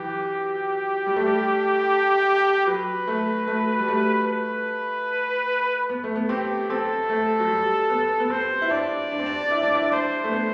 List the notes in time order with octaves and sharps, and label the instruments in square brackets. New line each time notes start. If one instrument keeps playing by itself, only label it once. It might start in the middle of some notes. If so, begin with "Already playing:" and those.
Already playing: [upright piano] E3 F#3 [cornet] G4
[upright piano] G3
A3
G3
[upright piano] F#3 [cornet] B4
[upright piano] A3
A3
G3
A3
[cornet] B4
[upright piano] B3
A3
B3
[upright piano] C4 [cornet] G4
[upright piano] C4 [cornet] A4
[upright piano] A3
F#3
G3
B3
B3
[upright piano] C4 [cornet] C5
[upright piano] E4
[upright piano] D4 [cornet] D5
[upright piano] D4
C4
D4
E4
D4
E4
[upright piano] D4 [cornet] C5
[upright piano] A3
B3